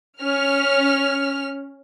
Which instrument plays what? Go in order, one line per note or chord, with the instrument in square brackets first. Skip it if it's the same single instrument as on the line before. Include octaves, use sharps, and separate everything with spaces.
[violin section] C#4 F6